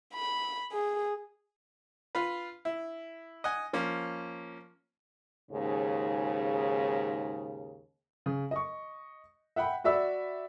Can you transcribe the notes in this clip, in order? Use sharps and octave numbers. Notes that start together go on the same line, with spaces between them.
B5
G#4
F4 B4
E4
D#5 F#5 G#5
F3 A#3 C#4
D#2 G#2 C#3
C#3
D#5 C#6
E5 F#5 G5 B5
F#4 D5 E5 B5 E6